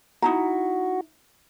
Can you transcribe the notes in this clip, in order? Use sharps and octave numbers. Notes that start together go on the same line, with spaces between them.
D#4 E4 F#4 A#5